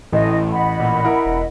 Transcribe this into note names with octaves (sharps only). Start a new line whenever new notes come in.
A1 A2 D#5
D#5 F#5 B5
A#2
E4 A#4
E1